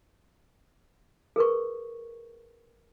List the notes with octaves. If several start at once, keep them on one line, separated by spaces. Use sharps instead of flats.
G#4 A#4 B4 C#6